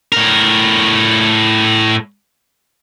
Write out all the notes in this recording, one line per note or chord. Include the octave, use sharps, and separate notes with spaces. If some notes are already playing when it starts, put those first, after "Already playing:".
A2 A#4